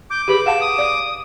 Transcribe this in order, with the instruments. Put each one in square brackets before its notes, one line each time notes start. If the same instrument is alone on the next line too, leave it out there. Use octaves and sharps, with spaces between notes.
[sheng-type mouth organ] D6 [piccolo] G6
[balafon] G4 G#4 B4 [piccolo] B5
[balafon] F5 F#5 A5 [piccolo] E7
[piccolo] D#6
[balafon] D5